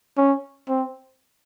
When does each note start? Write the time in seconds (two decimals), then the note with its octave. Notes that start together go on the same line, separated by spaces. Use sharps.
0.18 C#4
0.68 C4